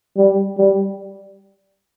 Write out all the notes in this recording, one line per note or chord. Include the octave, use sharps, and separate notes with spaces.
G3
G3